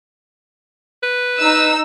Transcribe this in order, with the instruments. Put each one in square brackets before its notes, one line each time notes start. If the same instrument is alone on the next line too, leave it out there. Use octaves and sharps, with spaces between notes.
[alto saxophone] B4
[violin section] D#4 E6